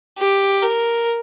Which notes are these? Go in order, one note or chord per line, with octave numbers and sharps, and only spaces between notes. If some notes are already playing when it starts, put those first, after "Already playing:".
G4
A#4